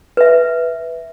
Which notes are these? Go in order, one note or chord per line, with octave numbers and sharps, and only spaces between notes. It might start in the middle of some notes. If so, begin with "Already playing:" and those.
B4 E5